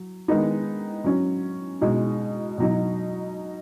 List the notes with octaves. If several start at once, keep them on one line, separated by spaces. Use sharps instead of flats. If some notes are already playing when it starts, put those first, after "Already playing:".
Already playing: F#3
D#3 G#3 B3 D#4
F#3 C#4
B2 G#3 D#4
B2 F#3 D#4